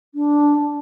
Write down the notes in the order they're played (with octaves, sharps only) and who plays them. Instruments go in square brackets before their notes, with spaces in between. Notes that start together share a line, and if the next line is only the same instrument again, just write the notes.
[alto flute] D4